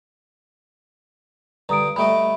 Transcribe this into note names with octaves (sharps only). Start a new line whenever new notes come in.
G2 D3 A#5 D#6 D7
G3 A3 D#5 B5 D7